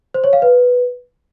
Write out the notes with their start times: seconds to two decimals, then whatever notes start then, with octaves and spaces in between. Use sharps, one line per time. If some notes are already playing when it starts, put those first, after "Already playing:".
0.14 C5
0.24 C#5
0.33 F5
0.42 B4